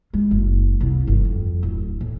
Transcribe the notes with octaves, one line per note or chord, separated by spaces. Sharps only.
G#3
F#1
C2
G1
F2
D1
A2